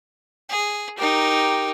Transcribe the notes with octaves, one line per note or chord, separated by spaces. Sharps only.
G#4
D#4 G4 A#4